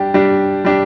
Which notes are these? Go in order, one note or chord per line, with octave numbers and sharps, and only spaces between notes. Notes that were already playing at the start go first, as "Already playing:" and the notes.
Already playing: G3 D4 G4
G3 D4 G4
G3 D4 G4